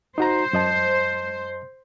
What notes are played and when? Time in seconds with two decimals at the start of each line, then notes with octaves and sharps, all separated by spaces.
0.18 D#4 F#4 C5 A#5
0.53 F#2 D#5 A5